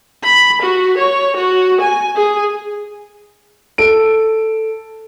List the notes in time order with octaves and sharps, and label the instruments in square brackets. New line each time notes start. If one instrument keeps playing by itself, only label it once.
[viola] B5
F#4
C#5
F#4
G#5
G#4
[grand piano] A4 D7